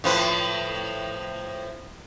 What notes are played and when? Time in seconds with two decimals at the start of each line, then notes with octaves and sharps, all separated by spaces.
0.04 A2 F3 B4